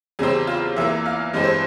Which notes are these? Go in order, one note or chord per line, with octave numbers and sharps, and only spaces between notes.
E2 C#3 G3 C4 G#4
F4
E2 E3 A#3 E5
F5
G2 E3 G#3 C4
C5